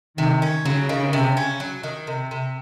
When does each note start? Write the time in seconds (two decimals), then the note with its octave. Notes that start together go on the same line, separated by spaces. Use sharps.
0.18 C3 D#3
0.42 C#4
0.65 C#3 F#3
0.89 D#3
1.13 C3
1.37 C#4
1.60 F#3
1.83 D#3
2.07 C3
2.31 C3